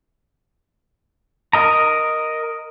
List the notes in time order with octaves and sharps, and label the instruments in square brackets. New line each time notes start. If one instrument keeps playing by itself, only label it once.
[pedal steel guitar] A#4 D#5 A#5